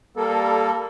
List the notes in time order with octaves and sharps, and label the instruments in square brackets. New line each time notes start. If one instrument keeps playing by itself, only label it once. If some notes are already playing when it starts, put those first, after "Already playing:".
[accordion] G3 A4 [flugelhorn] A#3